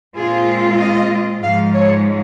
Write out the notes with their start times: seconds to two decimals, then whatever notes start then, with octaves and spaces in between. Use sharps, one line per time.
0.16 A#2 G#3 C4 F4 G#4
0.79 D#5
1.41 G#2 F3 G#3 F5
1.73 C#5